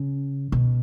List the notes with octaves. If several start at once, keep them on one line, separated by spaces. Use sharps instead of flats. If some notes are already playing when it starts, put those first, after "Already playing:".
Already playing: C#3
B2